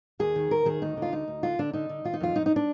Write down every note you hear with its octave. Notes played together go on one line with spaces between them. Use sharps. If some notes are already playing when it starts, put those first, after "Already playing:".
D#2 G#4
D#3
D#2 A#4
D#3 G#4
D2 D#4
D3
F4
D2 D#4
D2
D3 F4
D3 D4
D3 D#4
D3
D#3 F4
D#4
F2 F4
F2 D#4
D#4
D4